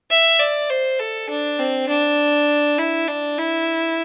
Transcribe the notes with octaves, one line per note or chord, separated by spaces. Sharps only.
E5
D5
C5
A4
D4
C4
D4
E4
D4
E4